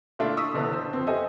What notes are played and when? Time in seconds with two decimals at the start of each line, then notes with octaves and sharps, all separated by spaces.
0.19 A#2 D3 A3 D4 E4 F4
0.37 C#6 D#6 E6 B6
0.54 F#1 B2 D3 E3
0.73 C5 E6
0.93 F2 B3 C4
1.07 G4 A4 C5 D#5 E5 G#5